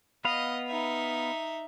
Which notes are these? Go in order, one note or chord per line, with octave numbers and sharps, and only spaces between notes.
B3 B4 D#5 F5
D#4 E5